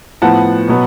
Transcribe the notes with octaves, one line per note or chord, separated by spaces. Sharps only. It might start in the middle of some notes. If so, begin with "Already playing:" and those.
A2 F3 B3 F#5 A5
B2 F#3 B3